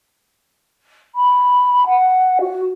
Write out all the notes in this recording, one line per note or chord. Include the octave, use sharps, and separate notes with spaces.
B5
F#5
F#4